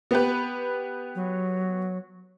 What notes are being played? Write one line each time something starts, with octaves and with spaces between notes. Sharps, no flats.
B3 G4 B4
F#3